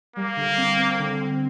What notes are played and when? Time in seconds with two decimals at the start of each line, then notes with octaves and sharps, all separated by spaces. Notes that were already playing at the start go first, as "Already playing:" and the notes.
0.16 G3 A#3
0.37 D3
0.57 C4
0.79 C4
0.99 D3
1.21 C4